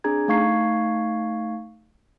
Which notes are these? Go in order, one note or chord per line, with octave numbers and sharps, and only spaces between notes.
C4 D4 G#4 A#5 G#6
A3 D#4 F5 C#6 G#6 C7